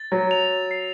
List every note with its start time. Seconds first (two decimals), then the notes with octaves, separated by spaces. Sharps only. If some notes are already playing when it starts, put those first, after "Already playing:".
Already playing: A6
0.12 F#3
0.31 F7
0.71 C7